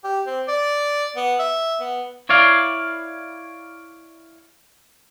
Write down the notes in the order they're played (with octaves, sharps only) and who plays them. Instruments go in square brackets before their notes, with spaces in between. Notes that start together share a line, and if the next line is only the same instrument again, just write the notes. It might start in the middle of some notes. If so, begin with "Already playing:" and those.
[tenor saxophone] G4
C4
D5
B3
E5
B3
[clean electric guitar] E4 C#5 D5 F5